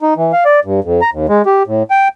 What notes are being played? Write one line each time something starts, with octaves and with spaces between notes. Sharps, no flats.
D#4
E3
F5
D5
G2
F2
A#5
D#2
G#3
G4
A2
G5